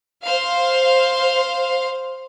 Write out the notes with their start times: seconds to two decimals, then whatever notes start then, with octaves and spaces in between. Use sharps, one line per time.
0.23 C5 F5